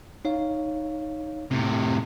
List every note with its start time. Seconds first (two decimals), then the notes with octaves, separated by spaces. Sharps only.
0.25 D#4 C#5 F5
1.51 A2 C3